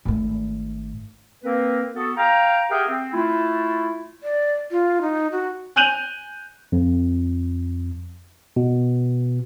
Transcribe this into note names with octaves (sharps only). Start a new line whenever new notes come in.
G#1 A3
A#3 C4 A#4 B4
B3 F#4 A4
F5 G5 A#5
G4 G#4 A#4 E5 F#5 G5
C4
A3 E4 F4
D5
F4
D#4
F#4
G#5 F#6 G6 D#7 F7 F#7
F2
B2